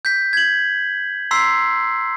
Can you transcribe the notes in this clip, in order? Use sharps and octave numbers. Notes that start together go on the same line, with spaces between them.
G6 B6
G#6 F#7
A#5 C6 E6 B6 C7